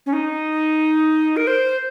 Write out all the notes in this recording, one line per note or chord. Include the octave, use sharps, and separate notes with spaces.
C#4
D#4
A#4
C5